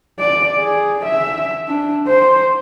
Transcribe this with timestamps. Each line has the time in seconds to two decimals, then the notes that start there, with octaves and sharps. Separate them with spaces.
0.19 D5
0.59 G#4
1.05 E5
1.68 D4
2.07 C5